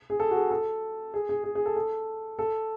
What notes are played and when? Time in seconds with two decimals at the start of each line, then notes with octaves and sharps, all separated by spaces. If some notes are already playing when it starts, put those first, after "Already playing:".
0.10 G#4
0.20 A4
0.31 F#4
0.35 G#4
0.51 A4
1.14 G#4
1.29 G#4
1.44 G#4
1.55 G#4
1.65 A4
1.76 A4
2.39 A4